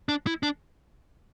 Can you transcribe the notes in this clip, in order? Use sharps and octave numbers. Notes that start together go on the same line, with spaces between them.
D4
E4
D4